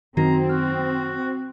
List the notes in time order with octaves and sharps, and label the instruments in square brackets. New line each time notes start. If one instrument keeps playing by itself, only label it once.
[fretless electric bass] F#2 D#3 [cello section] C4 [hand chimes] F#4 [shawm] A#5
[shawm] F#4 [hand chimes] F6